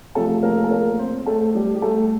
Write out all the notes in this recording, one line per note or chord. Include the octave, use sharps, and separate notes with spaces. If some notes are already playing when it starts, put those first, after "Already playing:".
C3 F3 A3 A4
A#3 A#4
A4
A#3 A#4
C4 C5
A3 A4
G3 G4
G4
A3 A4